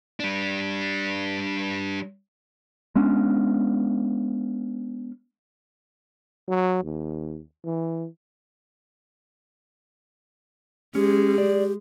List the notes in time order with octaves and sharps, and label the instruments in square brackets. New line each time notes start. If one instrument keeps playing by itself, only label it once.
[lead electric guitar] G3 D4
[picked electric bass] G#3 B3 C#4 D4
[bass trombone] F#3
D#2
E3
[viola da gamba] G#3 [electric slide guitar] C#4 [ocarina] G4
[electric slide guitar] D5